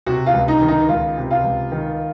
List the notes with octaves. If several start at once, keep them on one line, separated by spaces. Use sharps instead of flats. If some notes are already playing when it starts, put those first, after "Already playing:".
C3 F#4
F4
C#2
D#4
D#3
D#4
C#2 F4
C3
F4
C#2
D#3